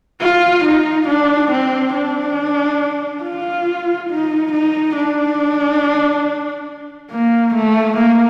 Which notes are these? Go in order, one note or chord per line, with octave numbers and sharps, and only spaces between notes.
F4
D#4
D4
C4
D4
F4
D#4
D#4
D4
A#3
A3
A#3